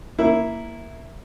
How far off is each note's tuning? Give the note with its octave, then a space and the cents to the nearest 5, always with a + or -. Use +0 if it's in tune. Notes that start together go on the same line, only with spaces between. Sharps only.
A#3 +0 E4 +0